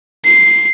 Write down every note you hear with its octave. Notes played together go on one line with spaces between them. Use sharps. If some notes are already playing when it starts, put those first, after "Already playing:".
C7